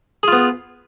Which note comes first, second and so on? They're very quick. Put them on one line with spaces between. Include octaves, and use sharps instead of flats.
G#4 F4 B3